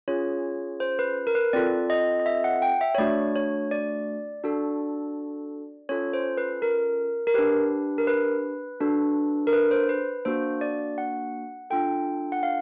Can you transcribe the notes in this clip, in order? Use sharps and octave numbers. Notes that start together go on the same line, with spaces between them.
C#4 F4 G#4 C#5
C5
B4
A#4
B4
C4 F4 A4 D5
D#5
D#5
E5
F#5
G5
E5
C#5
A3 D4 F#4 D5
C#5
D5
D4 F#4 A4
C#4 F4 A4 C#5
C5
B4
A#4
A#4
D4 G4 B4
A#4
B4
D4 F#4 A4
A#4
B4
C5
B4
A#3 D4 F#4 C5
D5
F#5
D4 F4 A4 G5
F#5
F5